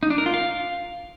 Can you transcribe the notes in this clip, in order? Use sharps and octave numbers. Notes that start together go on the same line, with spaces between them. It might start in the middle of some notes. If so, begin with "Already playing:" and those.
D#4
D4
A#4
F4
F5